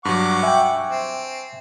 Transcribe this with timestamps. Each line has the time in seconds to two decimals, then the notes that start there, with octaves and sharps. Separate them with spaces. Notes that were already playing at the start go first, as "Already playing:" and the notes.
0.05 G2 F#3 F#5 C#6 D6
0.43 E5 G5 G#5
0.89 C4